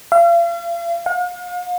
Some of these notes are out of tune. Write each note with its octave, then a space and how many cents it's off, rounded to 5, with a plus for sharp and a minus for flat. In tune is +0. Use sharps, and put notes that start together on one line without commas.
F5 -40
F5 +45